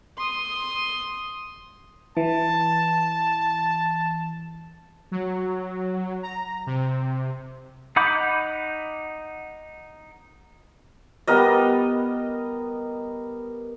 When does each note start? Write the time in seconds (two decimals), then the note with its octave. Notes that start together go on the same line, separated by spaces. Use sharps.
0.18 C6 D#6
2.17 E3 A5
5.11 F#3
6.23 A#5
6.67 C3
7.96 D#4 F#5 B5 D6 G6
11.27 G3 B3 A#4 D#5